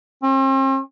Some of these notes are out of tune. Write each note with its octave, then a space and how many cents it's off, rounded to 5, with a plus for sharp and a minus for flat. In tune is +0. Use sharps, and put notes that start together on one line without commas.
C4 +45